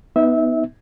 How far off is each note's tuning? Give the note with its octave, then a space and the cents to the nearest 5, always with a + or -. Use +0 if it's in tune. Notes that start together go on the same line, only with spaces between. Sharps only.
B3 +5 D#4 +20 E5 -25